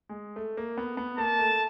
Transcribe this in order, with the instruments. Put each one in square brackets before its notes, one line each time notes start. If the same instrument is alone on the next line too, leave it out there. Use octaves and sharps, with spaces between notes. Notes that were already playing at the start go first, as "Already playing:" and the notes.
[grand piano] G#3
A3
A#3
B3
B3
[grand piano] A#3 [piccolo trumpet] A5
[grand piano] A3